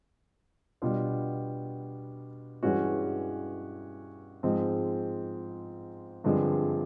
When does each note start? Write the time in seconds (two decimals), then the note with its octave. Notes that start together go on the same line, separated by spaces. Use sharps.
0.82 B2 G3 B3 D4 F4
2.63 G2 E3 G#3 C#4 F#4
4.43 G#2 F3 G#3 C4
6.24 G2 D3 F3 G#3 C4